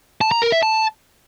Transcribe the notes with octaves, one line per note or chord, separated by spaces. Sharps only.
A5
A#5
A#4
E5
A5